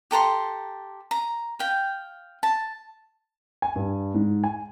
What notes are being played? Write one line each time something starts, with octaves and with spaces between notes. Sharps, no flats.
G4 A4 A#5 C6
A#5
F5 G5
A5
G#5
G2
G#2
G#5